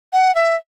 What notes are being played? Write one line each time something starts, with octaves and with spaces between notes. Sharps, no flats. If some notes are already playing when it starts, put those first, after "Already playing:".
F#5
E5